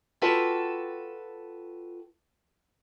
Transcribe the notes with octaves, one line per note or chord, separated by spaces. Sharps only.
F4 F#4 A4 B4 G5 A5